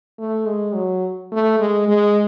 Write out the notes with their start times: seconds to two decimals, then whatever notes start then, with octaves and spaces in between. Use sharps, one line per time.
0.19 A3
0.46 G#3
0.74 F#3
1.32 A3
1.60 G#3
1.88 G#3